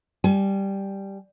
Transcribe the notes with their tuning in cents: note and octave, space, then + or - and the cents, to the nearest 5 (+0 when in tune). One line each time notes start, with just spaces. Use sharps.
G3 +0 G#5 +30